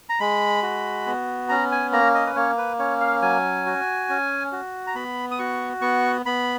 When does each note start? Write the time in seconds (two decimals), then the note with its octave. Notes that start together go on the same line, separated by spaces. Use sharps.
0.09 A#5
0.20 G#3 B5
0.62 F#4
1.07 B3
1.49 C#4 A#5
1.72 G#5
1.92 A#3 A#5
2.14 D#5
2.26 B4
2.36 A#3 C#5
2.58 B4
2.79 C#4 C#5
3.00 F5
3.22 F#3 G#5
3.66 F#4
4.09 C#4
4.52 F#4
4.87 A#5
4.95 B3 B5
5.31 D#6
5.39 F#4 C#6
5.82 B3 C#6
6.26 B3 B5